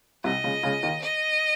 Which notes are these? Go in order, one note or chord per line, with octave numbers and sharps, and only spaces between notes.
C2 C3 D#5
C#2 C#3
C#2 C#3
D#2 D#3
D#5